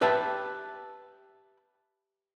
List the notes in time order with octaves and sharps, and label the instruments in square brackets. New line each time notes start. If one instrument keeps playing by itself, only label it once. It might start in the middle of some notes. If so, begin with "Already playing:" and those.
[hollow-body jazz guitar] G4 B4 E5 G5 A5